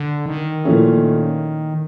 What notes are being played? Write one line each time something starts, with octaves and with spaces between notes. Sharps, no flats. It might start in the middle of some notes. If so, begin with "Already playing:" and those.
Already playing: D3
D#3
A#2 F3 A3 C#4 E4